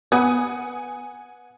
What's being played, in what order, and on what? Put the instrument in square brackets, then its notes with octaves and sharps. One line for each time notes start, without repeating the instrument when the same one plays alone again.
[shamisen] B3 B4 [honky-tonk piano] F#5 G#5 D#6